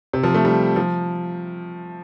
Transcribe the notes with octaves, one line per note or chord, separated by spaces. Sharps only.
C3
F3
A3
G3
F3